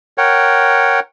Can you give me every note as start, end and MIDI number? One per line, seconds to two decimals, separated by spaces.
0.18 1.00 70
0.18 1.00 73
0.18 1.00 78
0.18 1.00 79